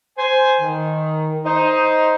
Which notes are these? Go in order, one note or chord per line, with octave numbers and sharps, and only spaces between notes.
C5 G#5
D#3
D#4 C5